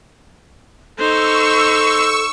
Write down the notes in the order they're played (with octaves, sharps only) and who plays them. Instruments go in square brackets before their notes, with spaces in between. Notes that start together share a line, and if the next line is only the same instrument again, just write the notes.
[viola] D#4 C5 [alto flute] A4 [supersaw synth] C#6 E6